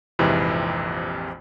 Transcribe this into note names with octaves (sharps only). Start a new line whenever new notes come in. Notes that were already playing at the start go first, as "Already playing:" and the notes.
A#1 F2 G#2 C3 E3